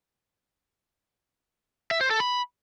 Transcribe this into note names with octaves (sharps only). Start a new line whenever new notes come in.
E5
C5
A4
B5